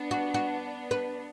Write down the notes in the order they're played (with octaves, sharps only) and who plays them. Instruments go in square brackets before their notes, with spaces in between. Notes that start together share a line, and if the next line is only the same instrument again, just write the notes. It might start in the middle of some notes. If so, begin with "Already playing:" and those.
Already playing: [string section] B3 D4
[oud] F#4
F#4
B4